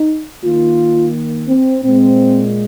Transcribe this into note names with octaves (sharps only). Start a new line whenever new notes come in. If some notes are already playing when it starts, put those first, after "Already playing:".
Already playing: D#4
D#3 A#3 F4
C4
A#2 G#3 C4